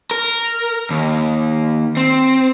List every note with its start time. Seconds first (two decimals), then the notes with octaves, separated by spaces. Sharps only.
0.11 A#4
0.91 D#2
1.97 C4